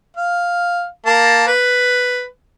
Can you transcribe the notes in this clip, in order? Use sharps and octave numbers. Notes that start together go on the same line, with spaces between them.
F5
A#3 A5
B4